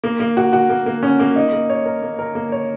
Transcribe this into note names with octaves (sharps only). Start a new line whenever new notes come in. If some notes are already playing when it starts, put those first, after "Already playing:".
A#3
A#3
F#4
F#4
A#3
A#3
C#4
A#3
D#4
A#3
C#5
A#4
A#3
A#4
A#3
C#5